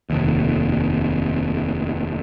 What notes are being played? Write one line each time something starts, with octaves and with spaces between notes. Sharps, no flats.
F1 D#2